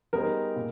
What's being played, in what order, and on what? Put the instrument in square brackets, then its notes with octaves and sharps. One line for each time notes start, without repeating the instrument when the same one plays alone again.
[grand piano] G3 B3 D#4 G#4 C5 [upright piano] A#4
[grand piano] A#2